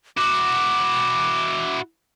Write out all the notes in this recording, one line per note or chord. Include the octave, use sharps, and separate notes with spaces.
E4 F#4 D6